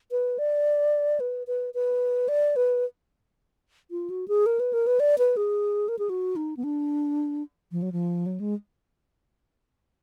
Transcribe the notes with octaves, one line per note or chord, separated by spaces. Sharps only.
B4
D5
B4
B4
B4
D5
B4
F4
F#4
G#4
A#4
B4
A#4
B4
D5
B4
G#4
A#4
G#4
F#4
D#4
B3
D4
F3
F#3
F3
F#3
G#3